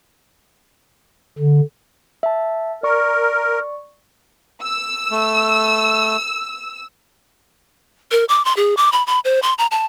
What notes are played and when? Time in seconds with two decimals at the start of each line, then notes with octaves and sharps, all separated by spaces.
1.39 D3
2.23 E5 A5
2.83 A#4 D5 C#6
4.62 E6
5.11 A3
8.11 A#4
8.29 D6
8.45 C6
8.57 G#4
8.77 D6
8.92 B5
9.07 B5
9.25 C5
9.43 C6
9.58 A#5
9.71 A5